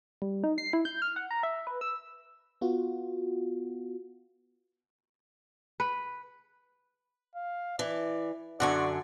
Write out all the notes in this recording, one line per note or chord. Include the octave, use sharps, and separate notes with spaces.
G3
D#4
C7
E4
G6
F6
F#5
A#5
E5
B4
E6
B3 F4 F#4
B4
F5
E3 D5
F#2 D3 D5 F#5 G#5 C6 C#6